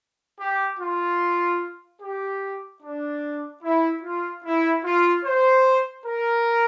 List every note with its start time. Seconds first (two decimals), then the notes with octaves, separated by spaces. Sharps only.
0.40 G4
0.80 F4
2.02 G4
2.82 D4
3.63 E4
4.04 F4
4.44 E4
4.85 F4
5.25 C5
6.06 A#4